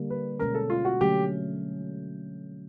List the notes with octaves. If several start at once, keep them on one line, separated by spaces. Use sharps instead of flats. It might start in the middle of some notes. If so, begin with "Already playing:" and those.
Already playing: D3 G3 A#3
B4
B2 G#3 C#4 A#4
A4
F4
F#4
D3 F#3 A3 C#4 G4